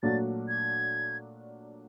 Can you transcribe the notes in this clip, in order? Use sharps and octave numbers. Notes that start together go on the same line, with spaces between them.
A#2 F#3 A3 D4 F#4 A6
G#6